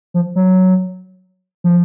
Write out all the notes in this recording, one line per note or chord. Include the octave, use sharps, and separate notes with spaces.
F3
F#3
F3